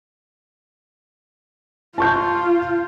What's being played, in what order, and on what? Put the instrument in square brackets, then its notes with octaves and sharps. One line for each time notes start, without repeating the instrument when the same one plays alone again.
[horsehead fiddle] F4 [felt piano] A5 C#6 G6